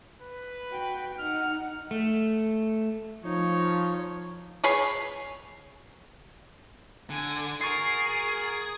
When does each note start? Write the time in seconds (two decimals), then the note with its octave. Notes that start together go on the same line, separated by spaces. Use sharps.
0.22 B4
0.71 F#4 G5
1.19 D#4 F#5 F6
1.91 A3
3.24 F3 D#4 C#5
4.64 G#4 B4 C#5
7.10 D3 G#5
7.61 F#4 G#4 A#4 C#6 A6 C7